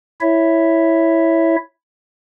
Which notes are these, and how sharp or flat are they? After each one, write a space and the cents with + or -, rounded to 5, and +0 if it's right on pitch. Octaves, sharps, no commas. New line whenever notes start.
E4 +0 C#5 +0 E5 +0